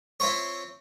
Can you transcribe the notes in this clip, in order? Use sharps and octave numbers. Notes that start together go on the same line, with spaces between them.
C4 E4 F4 C5 C#5